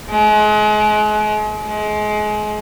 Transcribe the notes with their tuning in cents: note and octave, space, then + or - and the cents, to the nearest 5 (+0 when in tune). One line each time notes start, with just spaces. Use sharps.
G#3 +35
G#3 +30